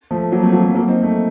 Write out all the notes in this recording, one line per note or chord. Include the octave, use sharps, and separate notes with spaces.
F3 A3
F#3 A#3
A3 C4
F#3 A#3
F3 A3
F#3 A#3
C4 D#4
A3 C4